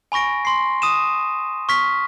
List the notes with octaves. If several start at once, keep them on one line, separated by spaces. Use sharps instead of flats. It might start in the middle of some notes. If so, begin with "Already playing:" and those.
G#5 B5 C#6 A#6 D7
C6 C7
D#6 D#7 E7
C#6 F6 B6